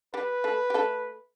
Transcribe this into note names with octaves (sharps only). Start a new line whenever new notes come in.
G3 G4 B4
A3 A4
G4
A3 A4